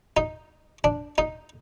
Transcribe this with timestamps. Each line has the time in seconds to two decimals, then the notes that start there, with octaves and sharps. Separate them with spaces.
0.17 D#4
0.84 D4
1.18 D#4